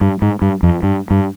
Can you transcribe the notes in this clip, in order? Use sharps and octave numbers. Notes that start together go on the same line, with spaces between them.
G2
G#2
G2
F2
G2
G2